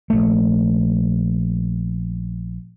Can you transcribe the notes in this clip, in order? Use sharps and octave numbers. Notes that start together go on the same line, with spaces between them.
A#1 A3